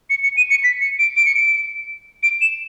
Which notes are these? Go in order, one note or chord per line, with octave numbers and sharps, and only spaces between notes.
C#7
C#7
D#7
C#7
B6
C#7
D7
D7
C#7
D7
D7
E7